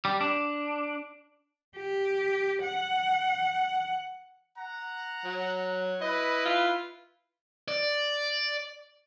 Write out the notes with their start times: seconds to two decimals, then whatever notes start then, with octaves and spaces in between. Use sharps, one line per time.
0.05 G3
0.21 D4
1.76 G4
2.63 F#5
4.57 F#5 A#5
5.25 F#3
6.02 E4 B4 D#5
6.46 F4
7.68 D5